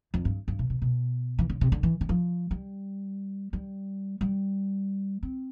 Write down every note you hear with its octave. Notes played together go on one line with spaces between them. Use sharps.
F2
G2
G2
B2
B2
B2
E3
D3
C3
D3
E3
D3
F3
G3
G3
G3
C4